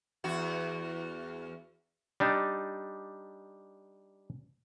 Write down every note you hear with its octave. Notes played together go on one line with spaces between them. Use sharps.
E2 F#4
G3 D4 D#4